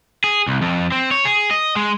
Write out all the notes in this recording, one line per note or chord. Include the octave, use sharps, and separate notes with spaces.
G#4
C2
F2
C4
C#5
G#4
D#5
G#3